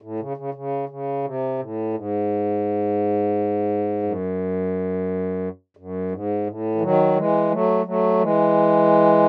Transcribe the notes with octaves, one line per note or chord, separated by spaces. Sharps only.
A2
C#3
C#3
C#3
C#3
C3
A2
G#2
F#2
F#2
G#2
A2
E3
D#3 F#3
E3 G#3
F#3 A3
F#3 A3
E3 G#3